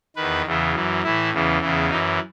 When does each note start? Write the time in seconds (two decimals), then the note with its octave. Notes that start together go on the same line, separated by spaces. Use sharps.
0.16 E2 D#3 B4
0.46 E2 C#3 E3
0.74 F#2 E3
1.04 A2 E3 E4
1.32 E2 C#3 E3
1.61 E2 C#3 E3
1.90 F#2 E3 D#4